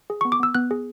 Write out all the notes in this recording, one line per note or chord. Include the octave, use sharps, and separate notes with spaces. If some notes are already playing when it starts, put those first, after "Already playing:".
G#4
C#6
B3
D6
B3 E6
B3 F#6
G#4